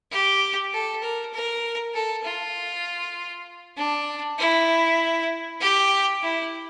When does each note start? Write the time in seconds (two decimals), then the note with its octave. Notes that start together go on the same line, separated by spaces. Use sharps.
0.12 G4
0.73 A4
1.03 A#4
1.34 A#4
1.94 A4
2.25 F4
3.77 D4
4.39 E4
5.61 G4
6.22 E4